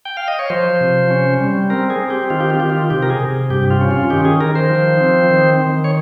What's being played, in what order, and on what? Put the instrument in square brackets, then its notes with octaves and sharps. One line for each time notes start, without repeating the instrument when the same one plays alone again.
[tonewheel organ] G5
F5
D#5
C#5
F3 C5
C3
C#4
G3
C4 A#4
G#4
C4
G4
D#3 F4
G4
F4
D#3 G4
F4
C3 G4
A#4
G#4
C3
G2 G4
F4
C#4
F4
D#3 G4
G#4
D#3 A#4
C5
F3
C4
D#3
D#3
C#5